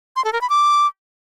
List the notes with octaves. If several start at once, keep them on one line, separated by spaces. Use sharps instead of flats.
C6
A4
A#4
B5
D6